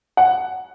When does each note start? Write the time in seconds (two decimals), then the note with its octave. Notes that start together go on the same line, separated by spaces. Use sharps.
0.17 F#5